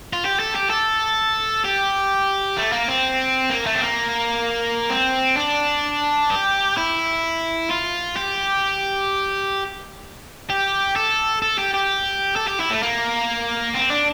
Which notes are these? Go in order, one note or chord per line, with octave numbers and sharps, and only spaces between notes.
F4
G4
A4
G4
A4
G4
A3
A#3
C4
A#3
A3
C4
A#3
C4
D4
G4
E4
F4
G4
G4
A4
A4
G4
G4
A4
G4
E4
A3
A#3
C4
D4